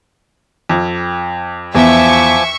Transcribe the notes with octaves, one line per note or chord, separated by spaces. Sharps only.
F2
E2 F3 E5 G#5 C#6 D6